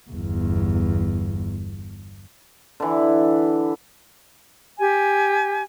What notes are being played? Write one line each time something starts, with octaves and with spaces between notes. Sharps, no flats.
G1 E2
D3 E3
G4 G#5